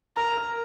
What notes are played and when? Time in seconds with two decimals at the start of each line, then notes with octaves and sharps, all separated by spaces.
0.17 A#4 A#5
0.37 A#4